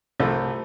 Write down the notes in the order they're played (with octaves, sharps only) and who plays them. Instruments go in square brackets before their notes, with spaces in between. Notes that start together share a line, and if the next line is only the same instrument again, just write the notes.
[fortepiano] C2 [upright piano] F3 A3